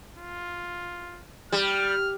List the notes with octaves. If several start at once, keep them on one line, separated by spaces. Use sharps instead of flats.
F4
G3 F6